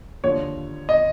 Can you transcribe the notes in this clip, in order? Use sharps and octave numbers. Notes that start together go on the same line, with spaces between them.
D#2 D3 F3 C#5
D#5